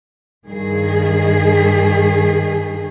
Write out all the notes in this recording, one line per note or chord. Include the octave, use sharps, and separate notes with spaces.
G2 D#3 G#4